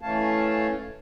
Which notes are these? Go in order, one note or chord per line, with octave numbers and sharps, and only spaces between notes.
E3 A3 C#4 C#5 F5 A5